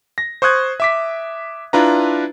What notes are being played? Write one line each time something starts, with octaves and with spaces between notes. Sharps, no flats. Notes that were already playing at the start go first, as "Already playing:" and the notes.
A#6
C5 C#6 D#6 F#6 G#6
E5 D6 B6
D4 E4 F4 B4 A#5